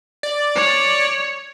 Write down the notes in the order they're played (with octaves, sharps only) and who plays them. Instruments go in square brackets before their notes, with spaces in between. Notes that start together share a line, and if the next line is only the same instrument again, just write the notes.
[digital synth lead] D5
[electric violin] C#5